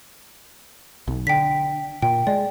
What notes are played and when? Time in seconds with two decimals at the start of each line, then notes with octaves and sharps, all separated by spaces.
1.08 B1
1.27 D3 G5 B6
2.02 A#2 G5
2.27 G#3 D5